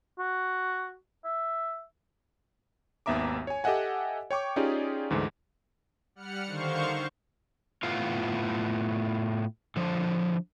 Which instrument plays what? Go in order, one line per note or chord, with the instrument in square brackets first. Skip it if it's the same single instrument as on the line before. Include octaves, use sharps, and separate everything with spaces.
[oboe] F#4
E5
[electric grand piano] G#1 D#2 B3 E5 A#5 D6
C#5 G#5
G4 A4 D#5 E5 F#5 G#5
C#5 G5 C#6 D6
C#4 D#4 F4 G4 G#4 D5
D2 G#2 D3 E3
[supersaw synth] G3 F#5 F6 C#7
D3 D#3 C5 F5 C#6
[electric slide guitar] A2 A3 B3 F4 F5
D3 F3